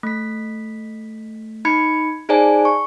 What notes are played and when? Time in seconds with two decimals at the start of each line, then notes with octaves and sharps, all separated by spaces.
0.03 A3 B6
1.65 D#4 B5 G#6 C#7
2.29 D#4 G#4 C5 D5 G#5 A5
2.65 C#6